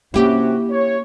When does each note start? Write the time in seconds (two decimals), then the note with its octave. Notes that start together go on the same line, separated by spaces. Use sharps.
0.14 C3 A#3 C#4 D4 E4 F#4 G4
0.70 C#5